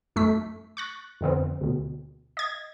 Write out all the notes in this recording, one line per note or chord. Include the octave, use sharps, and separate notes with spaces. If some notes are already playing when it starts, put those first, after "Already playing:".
F#2 A3 B6
C#6 F#6 A6
F2 D3 B3 C4
D2 B2
D#5 G#6